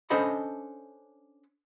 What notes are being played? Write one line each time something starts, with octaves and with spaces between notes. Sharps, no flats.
C#4 D4 A4 C5 D#5 B5